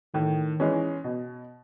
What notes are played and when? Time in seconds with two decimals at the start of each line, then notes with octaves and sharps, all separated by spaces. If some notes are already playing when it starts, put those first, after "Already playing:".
0.14 A2 D#3
0.60 E3 G#3 C#4
1.04 B2